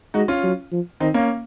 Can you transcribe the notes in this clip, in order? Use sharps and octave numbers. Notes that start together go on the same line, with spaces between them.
G#3 D#4 F#4
C#4 F4
F#3
F3
D#3 C4 D#4
A#3 C#4